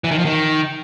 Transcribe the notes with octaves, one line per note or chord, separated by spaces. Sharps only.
E3
D#3
F3
D#3